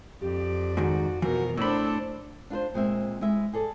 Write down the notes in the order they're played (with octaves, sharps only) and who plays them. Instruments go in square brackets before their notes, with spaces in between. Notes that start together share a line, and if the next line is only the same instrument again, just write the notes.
[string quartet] F2 D5 [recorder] G4
[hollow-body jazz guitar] G#2 D#3 [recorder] F#4
[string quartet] B2 A#4 [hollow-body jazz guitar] E3 F3 [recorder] F#4
[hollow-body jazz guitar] A2 B5 [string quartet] D4 A4 C5 [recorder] E6
[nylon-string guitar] D4 F4 B4 C5
A#2 G#3 C4 E5
G#3 E4 E5
G#4 A4 D5